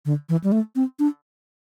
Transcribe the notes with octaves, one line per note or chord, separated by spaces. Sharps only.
D3
E3
G3
A3
C4
D4